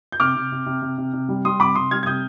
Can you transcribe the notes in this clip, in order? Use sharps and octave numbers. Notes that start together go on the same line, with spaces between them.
G6
C3 D6 F6
C3
C3
C3
C3
C3
C3
G3
G3 C6 D#6
C3 B5 D6
C3 C6 D#6
G3 F6 G#6
G#6
C3 D#6 G6